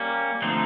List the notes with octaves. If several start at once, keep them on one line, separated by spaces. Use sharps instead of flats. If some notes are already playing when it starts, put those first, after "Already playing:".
Already playing: G3 A#3 C#4
D3 F3 A3 C4 D#4